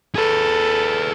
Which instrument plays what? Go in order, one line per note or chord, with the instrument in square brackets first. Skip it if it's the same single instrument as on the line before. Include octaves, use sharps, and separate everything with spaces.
[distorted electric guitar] G#4 B4 [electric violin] A4